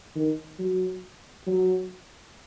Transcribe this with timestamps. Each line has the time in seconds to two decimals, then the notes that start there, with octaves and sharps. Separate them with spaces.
0.16 D#3
0.59 F#3
1.47 F#3